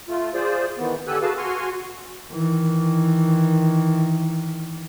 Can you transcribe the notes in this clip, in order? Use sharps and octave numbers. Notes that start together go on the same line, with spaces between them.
A3 F4
F4 G#4 C5 D5
D#3 E3 B3
D3 G4 A4 G#5 E6 F#6
F#4 G#4 B4 F5 A5
F#4 G#5 C6 C#6 F6
D#3 E3